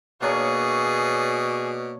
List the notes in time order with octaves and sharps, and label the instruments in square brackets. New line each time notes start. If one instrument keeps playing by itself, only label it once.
[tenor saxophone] B2 [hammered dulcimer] A#3 D4 C#5 [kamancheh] G#4